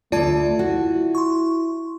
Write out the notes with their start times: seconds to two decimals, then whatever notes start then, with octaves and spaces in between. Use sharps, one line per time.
0.12 D2 B2 A3 F4 D5 A5 G#6
0.59 E4 F#4
1.15 C6 C#6